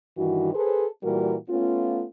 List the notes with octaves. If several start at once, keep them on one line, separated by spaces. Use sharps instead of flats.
G2 D#3 E3 F#4
G#4 A4 B4 C5
A#2 E3 G3 F#4 A#4
A3 B3 C#4 F4